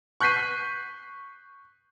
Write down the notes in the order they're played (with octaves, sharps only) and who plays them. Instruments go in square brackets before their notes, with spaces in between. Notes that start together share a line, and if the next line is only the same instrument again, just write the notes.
[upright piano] C#6 F#6 G6 B6 C7 D#7